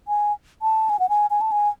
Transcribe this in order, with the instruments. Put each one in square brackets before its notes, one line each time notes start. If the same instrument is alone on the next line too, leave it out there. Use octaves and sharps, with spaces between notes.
[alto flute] G#5
A5
G#5
F#5
G#5
G#5
A5
G#5